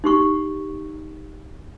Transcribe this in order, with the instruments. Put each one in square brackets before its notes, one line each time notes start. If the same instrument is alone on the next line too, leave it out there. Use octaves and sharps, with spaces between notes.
[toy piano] D#4 G4 C#6